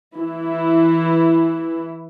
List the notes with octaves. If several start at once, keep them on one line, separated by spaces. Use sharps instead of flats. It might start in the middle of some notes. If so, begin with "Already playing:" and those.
E3 E4